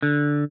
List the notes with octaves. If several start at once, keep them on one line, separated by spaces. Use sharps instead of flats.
D3